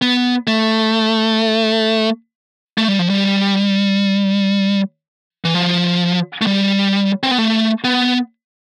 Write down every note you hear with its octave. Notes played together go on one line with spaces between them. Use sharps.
B3
A3
A3
G3
F3
G3
E3
F3
A3
G3
C4
B3
A3
B3